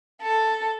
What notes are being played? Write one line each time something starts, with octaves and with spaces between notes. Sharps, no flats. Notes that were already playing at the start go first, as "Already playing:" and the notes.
A4